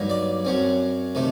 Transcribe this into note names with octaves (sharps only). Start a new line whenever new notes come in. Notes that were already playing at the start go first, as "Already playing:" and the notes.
Already playing: G2 F#3 A#3 D#4
D5
F#2 F#3 C4
C3 D#3 A3